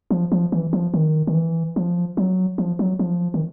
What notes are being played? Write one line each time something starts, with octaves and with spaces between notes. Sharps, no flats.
F3
F3
E3
F3
D#3
D#3
E3
F3
F#3
F3
F#3
F3
D#3